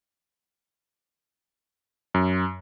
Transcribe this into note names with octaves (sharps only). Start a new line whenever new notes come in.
F#2